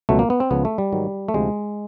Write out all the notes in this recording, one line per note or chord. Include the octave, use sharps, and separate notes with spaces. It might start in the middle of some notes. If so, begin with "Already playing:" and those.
C#2 B2 F#3 A3
A#3
B3
C4
C#2 C#3 F3 B3
A3
G3
G#2 D#3 F#3
A3
D2 C3 F3 G#3